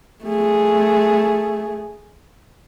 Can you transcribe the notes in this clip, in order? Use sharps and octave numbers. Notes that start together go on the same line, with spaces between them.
A3 G#4